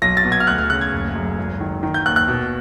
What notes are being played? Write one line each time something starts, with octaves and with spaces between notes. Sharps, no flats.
B1 A#6
A6
B2
G#6
F6
D2 F#6
F6
C#3 F#6
G#6
F#1
F#2
G#1
D#3
D#3
G6
D#2 F#6
F#6
B2